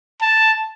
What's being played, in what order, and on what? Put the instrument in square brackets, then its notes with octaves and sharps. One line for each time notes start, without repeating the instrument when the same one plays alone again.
[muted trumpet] A5